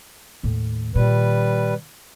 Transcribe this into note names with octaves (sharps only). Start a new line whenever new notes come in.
D#2 A2
A#2 D#3 G3 B4